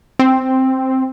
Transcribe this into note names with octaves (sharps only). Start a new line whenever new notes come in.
C4